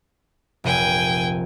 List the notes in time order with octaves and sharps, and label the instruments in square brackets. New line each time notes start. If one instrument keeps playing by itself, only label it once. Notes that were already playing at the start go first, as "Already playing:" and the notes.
[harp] F1 A#1 [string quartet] G5 G#5